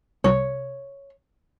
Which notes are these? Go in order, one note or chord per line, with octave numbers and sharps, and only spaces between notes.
C2 C#5